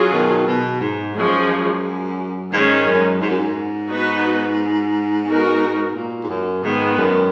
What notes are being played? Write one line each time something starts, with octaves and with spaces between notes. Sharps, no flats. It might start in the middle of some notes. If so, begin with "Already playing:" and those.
Already playing: F#3 C#4 F4 G#4
B2 D#3
B2
G#2
F#2 F3 G#3 C#4 G#4
G#2 D#3 G#3 C#4
F#2
G#2
F#2
G#2
B3 D#4 F#4 B4
B3 D#4 F#4 A#4
A#2
G#2
F#2
G#2 D#3 G#3 B3
F#2